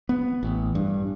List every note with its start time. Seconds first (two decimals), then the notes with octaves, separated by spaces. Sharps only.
0.09 B3
0.43 A1
0.75 G2